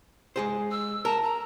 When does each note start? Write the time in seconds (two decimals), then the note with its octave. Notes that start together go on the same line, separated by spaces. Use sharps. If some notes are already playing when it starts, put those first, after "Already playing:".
0.36 G#3 G#4 C5
0.71 E6
1.05 A#4 A5
1.23 A#5